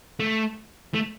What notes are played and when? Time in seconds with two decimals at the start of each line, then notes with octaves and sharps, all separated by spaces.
0.20 A3
0.94 A3